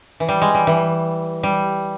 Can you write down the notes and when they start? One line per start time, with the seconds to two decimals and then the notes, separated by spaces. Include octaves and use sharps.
0.20 E3
0.28 G3
0.42 G#3
0.55 G3
0.67 E3
1.43 G3